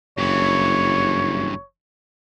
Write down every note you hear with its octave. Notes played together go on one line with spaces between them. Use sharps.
F#1 G2 E3 C#5